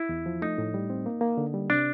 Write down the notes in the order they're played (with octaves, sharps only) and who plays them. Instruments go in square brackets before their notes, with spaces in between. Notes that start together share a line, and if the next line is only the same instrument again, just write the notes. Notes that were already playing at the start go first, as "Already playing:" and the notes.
Already playing: [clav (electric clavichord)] E4
[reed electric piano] E2
F3
[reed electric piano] A3 [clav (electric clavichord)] D#4
[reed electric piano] A2
G3
C4
A#3
A#3
D3
G3
[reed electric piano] C3 [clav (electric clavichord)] D4